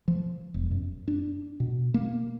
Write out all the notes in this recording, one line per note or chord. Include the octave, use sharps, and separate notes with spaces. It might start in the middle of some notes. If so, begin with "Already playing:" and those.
F3
E1
F#2
D4
B2
A#3